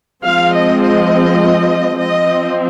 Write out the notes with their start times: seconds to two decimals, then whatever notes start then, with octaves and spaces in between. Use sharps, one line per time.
0.24 F3 G#3 C4 F5
0.54 D#5
0.83 D#5
1.99 F3 C4 D#5